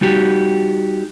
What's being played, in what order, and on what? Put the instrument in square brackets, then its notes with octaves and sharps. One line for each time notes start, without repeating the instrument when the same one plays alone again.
[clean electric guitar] G3 D#4 F#4 G4